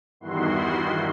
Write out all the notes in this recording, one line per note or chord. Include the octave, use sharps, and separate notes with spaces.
E2 G2 D#3 E4 F#4 C6